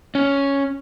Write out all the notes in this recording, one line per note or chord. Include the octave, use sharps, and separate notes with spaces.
C#4